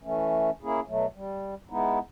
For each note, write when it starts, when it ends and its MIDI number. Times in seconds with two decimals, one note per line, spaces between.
0.03 0.50 52
0.03 0.50 57
0.03 0.50 61
0.63 0.80 58
0.63 0.80 61
0.63 0.80 64
0.63 0.80 68
0.88 1.06 47
0.88 1.06 54
0.88 1.06 57
1.15 1.55 55
1.70 1.99 56
1.70 1.99 59
1.70 1.99 63
1.70 1.99 64